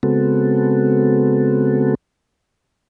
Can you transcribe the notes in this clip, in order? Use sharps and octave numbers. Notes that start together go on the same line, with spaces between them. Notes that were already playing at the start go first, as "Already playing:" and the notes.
C#3 G#3 B3 C4 F#4 A4